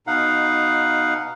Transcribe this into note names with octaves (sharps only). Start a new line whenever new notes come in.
B2 D#4 F5 F#5